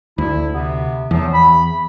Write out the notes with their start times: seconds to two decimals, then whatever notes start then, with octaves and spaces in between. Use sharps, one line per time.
0.18 D2 E4
0.54 C3 B3
1.11 E2 F3 F#3
1.33 B5